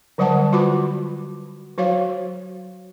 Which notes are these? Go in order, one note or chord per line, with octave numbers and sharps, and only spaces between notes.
D3 F#3 G3 D5 F#5 A5
F4 F#4 B4 B5 D6
F#3 F#4 C#5 F5